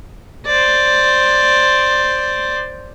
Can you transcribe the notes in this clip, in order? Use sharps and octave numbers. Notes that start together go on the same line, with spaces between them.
C5 D5